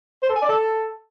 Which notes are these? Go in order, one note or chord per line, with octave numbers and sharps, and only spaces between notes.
C5
A4
G#5
D5
A4